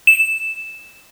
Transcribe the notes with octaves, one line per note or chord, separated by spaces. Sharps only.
E7